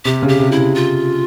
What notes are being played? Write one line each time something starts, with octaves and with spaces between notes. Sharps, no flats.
C3 G4
C#3
G4
C3
E4
C3
F4